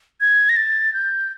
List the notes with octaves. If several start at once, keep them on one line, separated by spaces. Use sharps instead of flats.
G#6
A#6
A6
G6